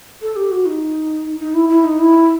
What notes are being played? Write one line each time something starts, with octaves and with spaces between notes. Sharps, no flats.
A4
G4
F#4
D#4
D#4
E4
E4
D#4
E4